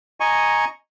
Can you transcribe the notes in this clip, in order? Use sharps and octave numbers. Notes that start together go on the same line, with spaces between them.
D#5 G#5 A#5 C#6